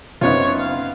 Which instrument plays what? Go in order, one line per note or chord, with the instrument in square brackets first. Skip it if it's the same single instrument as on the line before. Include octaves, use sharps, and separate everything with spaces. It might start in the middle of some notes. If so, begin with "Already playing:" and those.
[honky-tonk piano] F#1 C4 D#4 [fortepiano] B3 F4 [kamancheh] C#5
[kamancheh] F5